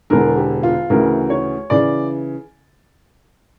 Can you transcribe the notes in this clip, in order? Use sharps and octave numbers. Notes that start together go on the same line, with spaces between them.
E1 E2 D3 A#4
G4
F4
D2 C#3 E3 A#4
C#5
C#3 E3 D5